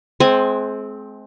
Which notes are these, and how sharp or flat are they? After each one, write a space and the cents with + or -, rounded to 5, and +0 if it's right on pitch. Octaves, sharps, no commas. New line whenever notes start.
G#3 +35 C4 +0 G#5 +0